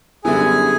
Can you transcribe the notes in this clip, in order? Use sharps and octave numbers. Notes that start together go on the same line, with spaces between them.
F#2 D3 G3 B3 E4 G#4 G#5